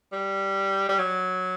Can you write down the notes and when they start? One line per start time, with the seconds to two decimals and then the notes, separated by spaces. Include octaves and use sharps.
0.12 G3
0.89 G3
0.99 F#3